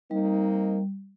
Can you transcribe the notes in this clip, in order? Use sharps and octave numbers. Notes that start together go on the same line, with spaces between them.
G3 A#3 C4 D#4